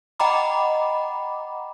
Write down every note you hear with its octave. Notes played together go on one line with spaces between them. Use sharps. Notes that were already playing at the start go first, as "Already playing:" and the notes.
D#5 F#5 G5 A#5 B5 D6